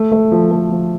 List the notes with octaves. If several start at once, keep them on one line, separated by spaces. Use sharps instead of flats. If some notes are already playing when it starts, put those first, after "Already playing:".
Already playing: A3
A3
F3
A3
F3